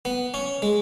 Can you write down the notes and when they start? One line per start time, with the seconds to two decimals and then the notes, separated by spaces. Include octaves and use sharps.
0.05 B3
0.34 C#4
0.62 G#3